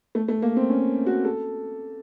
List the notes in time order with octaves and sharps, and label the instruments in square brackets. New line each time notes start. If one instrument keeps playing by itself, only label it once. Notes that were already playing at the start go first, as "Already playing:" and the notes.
[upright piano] A3
A3
A#3
C4
C#4
F#4
A4